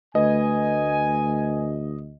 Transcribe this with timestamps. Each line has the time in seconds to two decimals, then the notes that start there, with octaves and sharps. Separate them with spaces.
0.15 D2 A3 B4 D#5 G#5